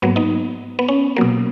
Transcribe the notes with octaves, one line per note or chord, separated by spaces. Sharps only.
G#2 F#3 A#3 B3
B3 D#4
B3
C#4
B2 F#3 A#3